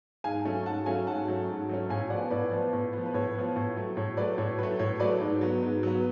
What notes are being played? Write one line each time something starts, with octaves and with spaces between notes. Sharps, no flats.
G#2 F5 G#5
F#3 A3 C#4
G#2 F#5 A5
F#3 A3 C#4 F5 G#5
G#2 F#5 A5
F#3 A3 C#4
G#2
F#3 A3 C#4
A2 F5 G#5
F3 B3 D5 F#5
A2 B4 D5
F3 B3
A2
F3 B3
B4
A2 C#5
F3 B3
A2
F#3 A3
A2 C#5
F#3 A3 B4 D5
A2 C#5
F#3 A3 B4
A2 C#5
F#3 A3 B4 D5
G#2
F#3 B3
G#2
F#3 B3